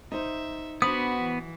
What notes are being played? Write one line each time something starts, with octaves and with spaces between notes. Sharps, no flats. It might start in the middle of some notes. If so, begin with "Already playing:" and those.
D#4 C5 E5
B3 D4 F#4 C5 B5 D#6
E3